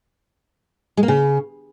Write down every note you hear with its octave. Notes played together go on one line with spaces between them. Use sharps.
G#3
A#3
C#3